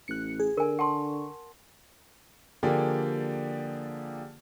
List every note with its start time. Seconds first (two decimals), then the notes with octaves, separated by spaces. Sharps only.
0.08 A1 F#6 C#7
0.40 G#4
0.57 D3 A#4 G#5
0.79 F#5 A5 C6 C#6
2.63 D3 F3 A#3 G4 G#4 D5